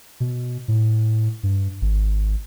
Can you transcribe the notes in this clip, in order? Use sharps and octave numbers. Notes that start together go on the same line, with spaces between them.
B2
A2
G2
G#1